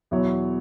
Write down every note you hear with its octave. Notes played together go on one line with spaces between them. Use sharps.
E2 B2 F#3 E4 C#5